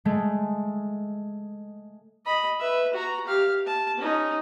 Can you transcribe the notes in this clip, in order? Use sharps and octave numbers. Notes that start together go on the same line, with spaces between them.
G#3 A3
D#5 B5
B4 E5
F#4 A#5
G4 F5
A5
C#4 D#4